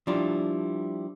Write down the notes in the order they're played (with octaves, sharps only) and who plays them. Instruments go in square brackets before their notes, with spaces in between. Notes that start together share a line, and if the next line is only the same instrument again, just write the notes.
[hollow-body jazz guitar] F3 G3 D4 E4